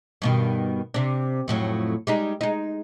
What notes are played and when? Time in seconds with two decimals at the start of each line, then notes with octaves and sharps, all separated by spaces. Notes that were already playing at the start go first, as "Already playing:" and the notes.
0.22 G2 B2 D#3
0.94 C3 D4
1.48 F2 A2 F#3
2.07 G3 G#3 D#4
2.41 G#3 D#4